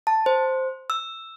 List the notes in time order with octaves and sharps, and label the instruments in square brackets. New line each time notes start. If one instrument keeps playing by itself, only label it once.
[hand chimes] A5
C5
E6